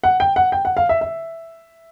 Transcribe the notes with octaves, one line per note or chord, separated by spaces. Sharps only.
F#5
G5
F#5
G5
F#5
F5
E5
E5